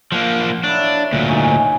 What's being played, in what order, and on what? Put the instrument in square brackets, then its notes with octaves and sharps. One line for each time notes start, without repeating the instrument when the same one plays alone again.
[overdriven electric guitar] F3 A#3 [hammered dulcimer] F5 F#5
[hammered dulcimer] F#3 E4 [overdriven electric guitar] D4
[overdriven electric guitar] D2 A#2 [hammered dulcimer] F#5
[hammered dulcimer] D#4 C#5 G#5